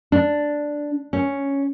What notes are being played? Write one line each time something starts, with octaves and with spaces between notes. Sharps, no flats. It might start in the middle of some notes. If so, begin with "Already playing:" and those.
D4
C#4